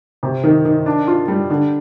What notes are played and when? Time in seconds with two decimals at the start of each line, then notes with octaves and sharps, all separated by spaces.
0.23 C3
0.43 D#3
0.65 D#3
0.86 D4
1.07 F4
1.28 G3
1.50 D3